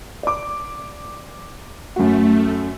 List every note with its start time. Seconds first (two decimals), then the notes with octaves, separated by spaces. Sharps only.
0.23 D5 D6
1.96 F#2 A3 F#4